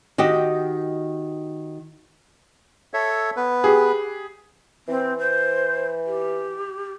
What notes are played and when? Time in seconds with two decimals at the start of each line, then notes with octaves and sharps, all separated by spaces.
0.18 D#3 F#4 G4 D#5
2.94 A4 C#5 E5
3.37 B3 B4
3.64 G4 G#4
4.88 E3 C4
5.19 C5
6.07 G4